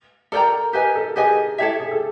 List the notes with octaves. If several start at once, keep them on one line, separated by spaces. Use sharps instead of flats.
A4 A#4 D5 G5 A#5
G4 A#4 B4 D#5 G#5
A4
G4 G#4 B4 D#5 G#5
E4 G4 A4 C#5 E5
G#4
A4